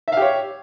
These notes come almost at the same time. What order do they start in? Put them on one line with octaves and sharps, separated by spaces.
E5 F5 G4 C#5